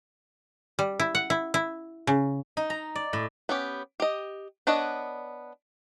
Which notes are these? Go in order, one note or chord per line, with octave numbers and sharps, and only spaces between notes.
G3
E4
F#5
E4
E4
C#3
D#4
A#5
D5
A2
B3 C#4 G4
G4 D#5
B3 D4 C#5 D#5 F#5